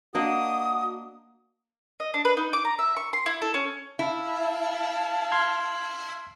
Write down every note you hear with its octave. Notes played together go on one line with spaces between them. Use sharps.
A#3 D4 F#4 D#5 D#6
D#5
D4
B4
D#4
D6
A#5
E5
C#6
C6
E4
A4
C#4
E4 F5 A5
C6 F6 G#6